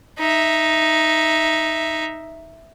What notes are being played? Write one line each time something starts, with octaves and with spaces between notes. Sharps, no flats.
D#4 E5